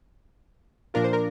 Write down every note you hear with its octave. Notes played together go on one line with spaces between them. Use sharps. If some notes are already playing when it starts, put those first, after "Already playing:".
A#2 F3 A#3 D4 F4 A#4
C5
A#4